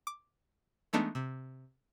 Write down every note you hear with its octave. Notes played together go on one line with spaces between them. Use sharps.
D6
E3 G#3 A3 B3 D4 D#4
C3